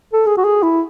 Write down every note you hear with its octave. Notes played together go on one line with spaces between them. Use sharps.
A4
G#4
F#4
G#4
E4